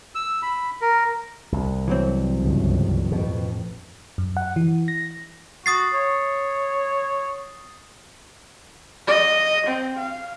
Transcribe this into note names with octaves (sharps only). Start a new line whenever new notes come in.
E6
B5
A#4
C2
E3 F#3 C4
G1 C#2
A1 F2 B2
F#2
F#5
E3
A#6
F#4 D#6 A6 C7
C#5
D#5
C4
F5